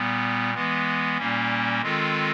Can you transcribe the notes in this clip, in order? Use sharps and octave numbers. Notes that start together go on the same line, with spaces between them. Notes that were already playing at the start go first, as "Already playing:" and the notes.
Already playing: A#2 G3 B3
E3 G#3 B3
A#2 G3 A#3 C#4
D#3 G#3 C4 F4 A4